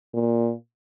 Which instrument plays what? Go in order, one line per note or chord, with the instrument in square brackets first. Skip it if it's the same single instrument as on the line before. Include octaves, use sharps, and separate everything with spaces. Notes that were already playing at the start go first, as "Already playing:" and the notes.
[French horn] A#2